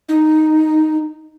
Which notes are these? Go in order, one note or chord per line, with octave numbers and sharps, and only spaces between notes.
D#4